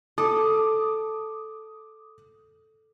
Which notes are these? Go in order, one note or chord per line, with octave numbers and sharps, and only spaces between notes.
A4 D6 D#6